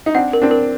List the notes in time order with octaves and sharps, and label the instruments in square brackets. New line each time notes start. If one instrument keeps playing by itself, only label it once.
[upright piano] D#4
[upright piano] C4 D4 [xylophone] F#5
[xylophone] A#4
[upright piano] C4 D4
[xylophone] A#4